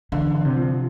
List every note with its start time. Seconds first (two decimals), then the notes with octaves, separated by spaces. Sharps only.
0.12 D3 E3
0.35 D3
0.45 C3
0.56 F3